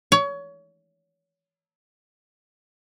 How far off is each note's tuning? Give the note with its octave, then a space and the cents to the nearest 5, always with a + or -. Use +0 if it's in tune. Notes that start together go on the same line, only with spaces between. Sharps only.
C#5 +25